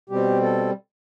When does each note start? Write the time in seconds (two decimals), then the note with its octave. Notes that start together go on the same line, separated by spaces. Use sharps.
0.10 B2 G3 C4 G4
0.42 A4